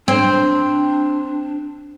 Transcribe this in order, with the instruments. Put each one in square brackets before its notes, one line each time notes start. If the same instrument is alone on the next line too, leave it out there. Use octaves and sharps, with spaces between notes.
[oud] C4 [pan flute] D4